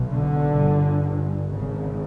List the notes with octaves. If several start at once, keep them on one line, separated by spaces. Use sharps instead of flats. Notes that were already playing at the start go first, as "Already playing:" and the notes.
Already playing: B1 B2
D3
G1 G2
G#1 G#2 C#3